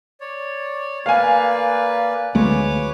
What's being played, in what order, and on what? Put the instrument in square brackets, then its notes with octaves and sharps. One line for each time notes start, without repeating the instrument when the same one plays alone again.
[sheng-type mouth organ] C#5 D5
[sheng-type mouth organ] A#3 B4 D5 [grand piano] F5 G#5
[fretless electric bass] D2 G#3 A3 [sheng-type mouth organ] B4 C#5 D6